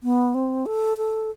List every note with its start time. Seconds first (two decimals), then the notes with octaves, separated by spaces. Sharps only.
0.03 B3
0.34 C4
0.66 A4
0.97 A4